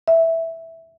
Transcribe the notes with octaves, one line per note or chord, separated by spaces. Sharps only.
E5